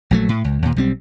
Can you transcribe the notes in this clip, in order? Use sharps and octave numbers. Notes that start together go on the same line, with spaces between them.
A#1 F#3 A3
A2
C#2
D#2 A#2
B1 G3 C4